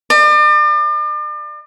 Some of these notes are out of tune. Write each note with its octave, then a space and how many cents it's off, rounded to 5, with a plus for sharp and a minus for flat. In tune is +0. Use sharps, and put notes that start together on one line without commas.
D5 +40